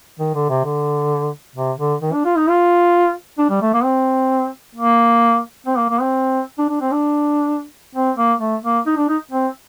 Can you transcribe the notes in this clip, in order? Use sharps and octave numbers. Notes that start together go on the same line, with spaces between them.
D#3
D3
C3
D3
C3
D3
D#3
D4
F4
D#4
F4
D4
G3
A3
A#3
C4
A#3
C4
A#3
A#3
C4
D4
D4
C4
D4
C4
A#3
A3
A#3
D#4
D4
D#4
C4